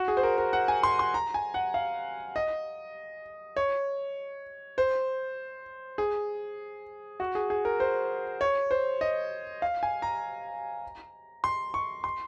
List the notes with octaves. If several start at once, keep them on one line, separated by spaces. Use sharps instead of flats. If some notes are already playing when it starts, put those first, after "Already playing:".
Already playing: F#4
G#4
C5
A#4
A#4
F#5
G#5
C6
C6
A#5
G#5
F#5
F5
D#5
C#5
C5
G#4
F#4
G#4
G#4
A#4
C5
C#5
C5
D#5
F5
G#5
A#5
C6
C#6
C6